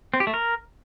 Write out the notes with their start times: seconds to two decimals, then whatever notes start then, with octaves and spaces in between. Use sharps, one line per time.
0.14 C4
0.20 G4
0.27 A3
0.34 A#4